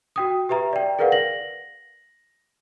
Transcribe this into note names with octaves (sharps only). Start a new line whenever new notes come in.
F#4 G5 D#6
G4 B4 E5 A#5
D5 G5
G#4 A#4 B4 D5 F5 F#5
A#6 F#7